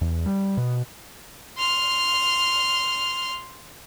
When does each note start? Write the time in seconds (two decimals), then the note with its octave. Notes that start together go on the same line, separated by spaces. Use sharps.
0.01 E2
0.26 G3
0.57 B2
1.58 C6 F6